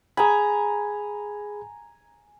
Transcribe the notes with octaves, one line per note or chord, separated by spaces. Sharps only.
G#4 G#5 A#5 B5